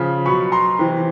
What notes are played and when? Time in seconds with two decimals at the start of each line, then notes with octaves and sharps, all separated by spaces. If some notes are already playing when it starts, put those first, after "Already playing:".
Already playing: C#3 F3
0.26 B2 F#3 B5 C#6
0.52 A#5 C6
0.79 C3 E3